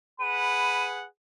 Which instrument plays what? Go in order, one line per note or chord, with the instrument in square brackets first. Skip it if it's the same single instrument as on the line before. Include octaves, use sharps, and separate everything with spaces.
[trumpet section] G#4 B4 F#5 [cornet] B5 [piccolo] D#7